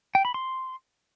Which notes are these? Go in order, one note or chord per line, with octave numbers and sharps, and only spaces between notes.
G5
B5
C6